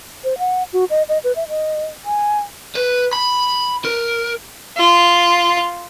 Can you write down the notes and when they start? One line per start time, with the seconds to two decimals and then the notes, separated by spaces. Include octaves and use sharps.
0.24 C5
0.38 F#5
0.73 F#4
0.90 D#5
1.09 D#5
1.24 B4
1.36 E5
1.49 D#5
2.05 G#5
2.75 B4
3.13 B5
3.85 A#4
4.78 F4